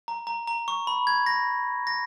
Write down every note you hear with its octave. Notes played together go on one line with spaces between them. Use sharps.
A#5
A#5
A#5
C#6
B5
G#6
A#6
A#6